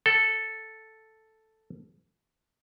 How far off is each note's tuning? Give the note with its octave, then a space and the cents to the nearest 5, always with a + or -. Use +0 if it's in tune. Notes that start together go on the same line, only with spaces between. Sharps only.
A4 +0 F#5 +40